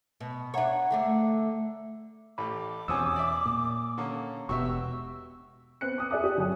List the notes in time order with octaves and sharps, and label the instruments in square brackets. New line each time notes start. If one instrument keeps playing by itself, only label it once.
[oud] B2
[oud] D4 C#5 [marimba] E5 F#5 A#5
[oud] D3 A3 D4
[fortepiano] A1 A3 G4 [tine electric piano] B5 [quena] D6
[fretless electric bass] E2 [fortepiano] B2 C4 C#4 [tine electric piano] G#5 D#6 E6
[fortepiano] D5 E5
[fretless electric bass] A#2
[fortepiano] D3 A#3 C#4
[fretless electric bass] E1 B2 [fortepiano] F#4 G4 E5 [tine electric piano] C#6 [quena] E6
[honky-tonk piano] B3 C4 F#6 C#7
D6 D#6
G#4 D5 E5 D#6
G4
G1 F#3 G4 C#5 G#5 D#6